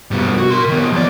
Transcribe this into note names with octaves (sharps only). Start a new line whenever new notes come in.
G2 B2
F#4
A#4 C6
D#3 B3
F2 D5